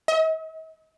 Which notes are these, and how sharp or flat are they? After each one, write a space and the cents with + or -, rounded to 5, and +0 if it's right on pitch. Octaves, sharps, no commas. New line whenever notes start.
D#5 +45